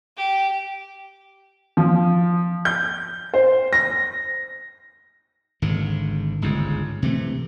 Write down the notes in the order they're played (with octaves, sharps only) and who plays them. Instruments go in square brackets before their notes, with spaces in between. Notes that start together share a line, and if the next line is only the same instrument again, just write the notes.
[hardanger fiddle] G4
[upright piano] F3
G6
C5
A#6
[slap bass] G#1 G#2 D3
G1 C#2 G#2
C3 E3 A3